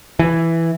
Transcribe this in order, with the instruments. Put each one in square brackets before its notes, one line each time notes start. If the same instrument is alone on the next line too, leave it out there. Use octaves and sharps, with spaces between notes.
[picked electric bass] E3